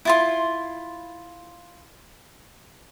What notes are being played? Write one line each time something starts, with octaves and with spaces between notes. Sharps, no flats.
E4 F4 C6